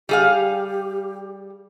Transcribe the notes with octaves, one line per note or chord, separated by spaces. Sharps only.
G3 G4 G#4 F5